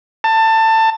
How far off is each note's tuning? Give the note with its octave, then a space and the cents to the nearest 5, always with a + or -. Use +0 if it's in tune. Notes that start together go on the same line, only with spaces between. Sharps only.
A5 +20